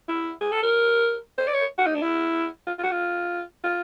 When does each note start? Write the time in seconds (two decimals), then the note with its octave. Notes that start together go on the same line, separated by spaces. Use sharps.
0.08 E4
0.41 G#4
0.51 A4
0.62 A#4
1.38 C5
1.48 D5
1.54 C#5
1.78 F#4
1.86 D#4
1.95 D4
2.02 E4
2.67 F4
2.78 F4
2.83 F#4
2.91 F4
3.64 F4